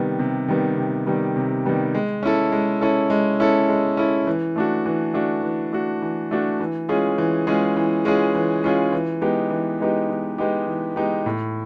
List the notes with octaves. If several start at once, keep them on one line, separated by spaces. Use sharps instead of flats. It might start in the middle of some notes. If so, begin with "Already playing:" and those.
Already playing: C3 D#3 G3 B3
C3
D#3 G3 B3
C3
D#3 G3 B3
C3
D#3 G3 B3
G#3
C#4 E4 A4
G#3
C#4 E4 A4
G#3
C#4 E4 A4
G#3
C#4 E4 A4
E3
A3 D4 F#4
E3
A3 D4 F#4
E3
A3 D4 F#4
E3
A3 D4 F#4
E3
G#3 C#4 F4 G#4
E3
G#3 C#4 F4 G#4
E3
G#3 C#4 F4 G#4
E3
G#3 C#4 F4 G#4
E3
G#3 B3 D#4 G4
E3
G#3 B3 D#4 G4
E3
G#3 B3 D#4 G4
E3
G#3 B3 D#4 G4
A2